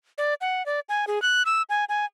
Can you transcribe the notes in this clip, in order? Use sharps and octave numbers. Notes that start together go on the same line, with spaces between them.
D5
F#5
D5
G#5
G#4
F#6
E6
G#5
G#5